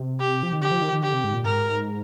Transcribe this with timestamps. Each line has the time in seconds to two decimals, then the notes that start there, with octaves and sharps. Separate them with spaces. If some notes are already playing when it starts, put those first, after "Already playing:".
Already playing: C3
0.20 G4
0.43 F3
0.53 D#3
0.61 D3 G4
0.71 F3
0.82 D#3
0.93 D#3
1.03 D3 G4
1.13 C3
1.24 G#2
1.34 A#2
1.44 G#2 A#4